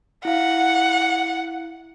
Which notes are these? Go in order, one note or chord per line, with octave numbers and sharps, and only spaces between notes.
E4 F5 F#5